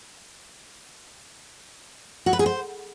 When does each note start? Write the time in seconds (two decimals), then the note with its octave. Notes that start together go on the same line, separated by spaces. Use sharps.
2.26 F#4
2.33 B4
2.39 G#4
2.46 C5